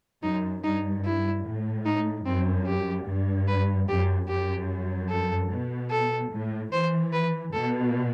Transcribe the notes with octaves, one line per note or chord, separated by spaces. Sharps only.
F#2 D#4
G2 D#4
E4
A2
D#4
F#2 C4
G4
G2
B4
F#2 G4
F#2 G4
A4
B2
A4
A2
E3 C5
B4
B2 A4